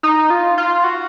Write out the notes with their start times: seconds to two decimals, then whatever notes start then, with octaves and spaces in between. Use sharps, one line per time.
0.03 D#4
0.30 F4
0.58 F4
0.84 F#4